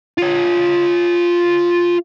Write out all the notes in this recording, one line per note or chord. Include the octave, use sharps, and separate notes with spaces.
F4 C#5